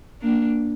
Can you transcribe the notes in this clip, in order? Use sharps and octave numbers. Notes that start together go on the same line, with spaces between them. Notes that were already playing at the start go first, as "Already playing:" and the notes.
A#3 D4